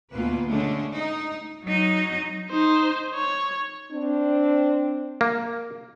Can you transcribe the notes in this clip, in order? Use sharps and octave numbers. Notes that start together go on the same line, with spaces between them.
D2 B2 A3 A#3 F4 B4
D3 G#3 A3 C#4 D4
D#4
F#3 D#4
D#4 C5
C#5
C4 D4
A#3